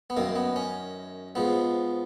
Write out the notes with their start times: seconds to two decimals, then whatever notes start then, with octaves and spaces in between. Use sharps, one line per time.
0.10 B3
0.17 F#2 D#3 A#3
0.36 B3
0.56 C#4
1.35 G#2 F3 B3